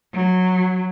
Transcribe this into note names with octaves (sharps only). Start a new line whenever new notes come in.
F#3